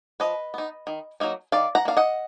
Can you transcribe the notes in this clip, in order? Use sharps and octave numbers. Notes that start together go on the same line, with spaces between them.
F3 B4 D#5
B3 D#4
D#3
F#3 A#3 D#4
D#3 D5 F5
F#5 A#5
A#3 D4 F5
D#5 F#5